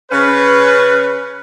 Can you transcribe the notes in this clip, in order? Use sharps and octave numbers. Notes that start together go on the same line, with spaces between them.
C#3 C#4 B4